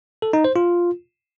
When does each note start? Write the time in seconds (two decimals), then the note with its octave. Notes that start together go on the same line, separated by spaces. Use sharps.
0.22 A4
0.33 D#4
0.44 C5
0.56 F4